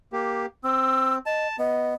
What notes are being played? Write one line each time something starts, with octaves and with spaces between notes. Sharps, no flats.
A#3 G4
C4 E6
D#5 A5
B3 D#5